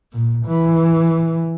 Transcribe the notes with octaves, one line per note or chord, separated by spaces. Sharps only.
A#2
E3